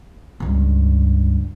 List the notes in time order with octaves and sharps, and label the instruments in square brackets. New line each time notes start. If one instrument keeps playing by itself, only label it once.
[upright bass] C#2 G2